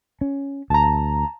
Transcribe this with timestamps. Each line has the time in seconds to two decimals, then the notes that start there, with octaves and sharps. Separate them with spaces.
0.21 C#4
0.70 D2 A5 A#5